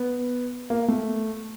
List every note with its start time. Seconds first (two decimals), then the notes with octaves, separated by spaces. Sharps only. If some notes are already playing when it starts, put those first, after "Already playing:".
Already playing: B3
0.70 A#3
0.88 A3